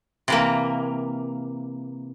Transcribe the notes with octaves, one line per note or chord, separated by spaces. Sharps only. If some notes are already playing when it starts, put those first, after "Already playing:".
C3 E3 A#3